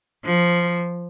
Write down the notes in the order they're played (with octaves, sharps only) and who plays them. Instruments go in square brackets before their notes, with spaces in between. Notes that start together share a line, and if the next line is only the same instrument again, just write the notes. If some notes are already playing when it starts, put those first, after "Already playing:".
[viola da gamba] F3